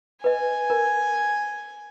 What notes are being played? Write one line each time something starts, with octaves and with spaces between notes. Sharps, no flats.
B4 D#5 G#5
A#4